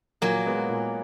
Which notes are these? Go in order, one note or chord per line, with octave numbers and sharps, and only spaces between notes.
A#2 F#3 A#3
G#3 B3
A#2